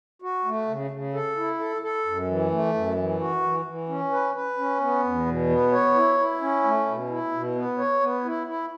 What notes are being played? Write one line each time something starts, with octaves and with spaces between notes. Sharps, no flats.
F#4
A3
C#3
C#3
A4
E4
A4
A4
F#2
E3
A3
F#2
E3
F#4
E3
E3
C#4
B4
B4
C#4
B3
E2
B2
B3
C#5
E4
E4
C#4
A3
B2
E4
B2
B3
C#5
B3
E4
E4